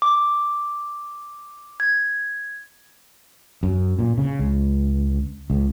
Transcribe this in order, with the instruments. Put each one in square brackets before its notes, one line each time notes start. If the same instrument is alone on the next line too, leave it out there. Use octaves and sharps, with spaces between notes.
[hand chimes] D6
G#6
[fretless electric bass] F#2
A#2
C#3
C#2
C#2